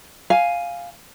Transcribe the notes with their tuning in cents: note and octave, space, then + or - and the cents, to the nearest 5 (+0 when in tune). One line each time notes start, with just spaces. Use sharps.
F5 +0 G#5 +0